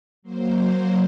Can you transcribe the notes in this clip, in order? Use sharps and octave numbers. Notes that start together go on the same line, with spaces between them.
F#3 A#3 C5